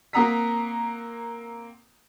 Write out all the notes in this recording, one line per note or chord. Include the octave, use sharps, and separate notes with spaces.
A#3 C4 F#5 A#5 D#6 B6